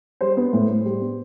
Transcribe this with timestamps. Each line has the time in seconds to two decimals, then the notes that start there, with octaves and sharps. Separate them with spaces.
0.21 G3 C5
0.37 B3
0.53 A2
0.69 A2
0.85 G3
1.01 B3